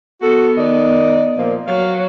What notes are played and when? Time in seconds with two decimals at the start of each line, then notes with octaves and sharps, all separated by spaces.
0.22 B3 F#4 A4
0.57 D#3 D5 D#5
1.37 A#2 F3 A#3
1.67 F#3 F5